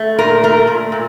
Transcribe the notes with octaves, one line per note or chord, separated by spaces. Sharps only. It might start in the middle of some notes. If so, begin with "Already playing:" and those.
Already playing: A3
A#2 A#4
A3 A#4
A#2
A#2